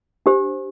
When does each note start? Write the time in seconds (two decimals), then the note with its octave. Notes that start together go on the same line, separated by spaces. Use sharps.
0.26 D4 G4 C5